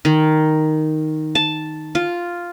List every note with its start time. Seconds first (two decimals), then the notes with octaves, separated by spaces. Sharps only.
0.05 D#3
1.35 A5
1.95 F4